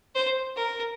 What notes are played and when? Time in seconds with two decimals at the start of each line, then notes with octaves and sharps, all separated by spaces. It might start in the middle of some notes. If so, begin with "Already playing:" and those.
0.15 C5
0.56 A#4